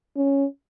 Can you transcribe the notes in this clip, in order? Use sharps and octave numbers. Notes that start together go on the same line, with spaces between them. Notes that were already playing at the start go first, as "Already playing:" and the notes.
C#4